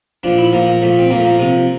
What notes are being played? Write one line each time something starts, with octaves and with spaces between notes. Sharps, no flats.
A#2 F3 D4
E4
A#2 F3 A#3
A#3
A#2 F3 A3
C4
A#2 F3 A#3
A3
A#3
C3 F3